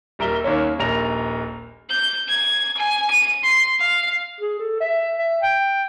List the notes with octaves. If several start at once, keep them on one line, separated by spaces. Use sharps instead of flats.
D#1 G3 A#4 E5 G7
D#2 A#3 C#4
D#1 A#1 A#4 A#6 F7
G6
G#6
G#5
D#7
C6
F5
G#4
A4
E5
E5
G5